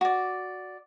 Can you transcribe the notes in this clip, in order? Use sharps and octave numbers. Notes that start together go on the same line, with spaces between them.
F#4 D5